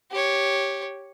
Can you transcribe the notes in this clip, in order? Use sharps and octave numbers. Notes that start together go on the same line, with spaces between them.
G4 C#5